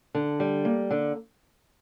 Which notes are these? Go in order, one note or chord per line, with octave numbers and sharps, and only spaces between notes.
D3
G3
A#3
D3